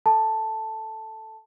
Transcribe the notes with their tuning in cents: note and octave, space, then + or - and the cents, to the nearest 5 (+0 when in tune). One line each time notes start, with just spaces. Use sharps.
A4 +0 A5 +0